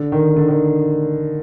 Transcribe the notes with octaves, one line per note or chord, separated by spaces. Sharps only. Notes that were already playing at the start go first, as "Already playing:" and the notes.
Already playing: D3
D#3
D3
D#3